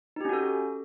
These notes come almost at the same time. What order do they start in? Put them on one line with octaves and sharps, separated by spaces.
D#4 G4 C#4 F#4 A4